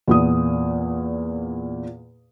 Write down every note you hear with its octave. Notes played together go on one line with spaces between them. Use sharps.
E2 A#2 D#6